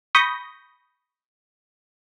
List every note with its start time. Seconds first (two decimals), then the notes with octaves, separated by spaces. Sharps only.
0.15 B5 C#6 D#6 G6 A#6